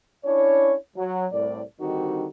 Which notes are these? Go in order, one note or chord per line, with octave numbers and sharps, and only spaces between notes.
C#4 D4 E4 C#5
F#3
C2 A2 D5
D3 D#3 G3 C4 D#4 F#4